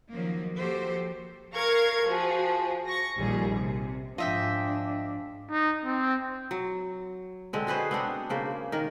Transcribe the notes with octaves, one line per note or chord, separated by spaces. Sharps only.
D#3 F3 F#3 A#3
F3 A#3 F#4 G4 A4 C5
A#4 F5 C#6 G#6
F3 F#4 G#4
C#6 A#6
A#1 D#2 A#2 G3 G#4
C3
G#2 F3 D4 D#5 E5 G5
D#4
C4
F#3
D3 G#3 C4
F#4 G#4 B4 C5
B3 C4 D4 F#4
C#3 A#3 C5
D#3 A#4